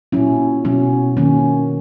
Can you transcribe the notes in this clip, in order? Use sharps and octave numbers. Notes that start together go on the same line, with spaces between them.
A#2 F#3 C#4 E4
B2 F#3 C#4
D#3 F#3 A#3 C#4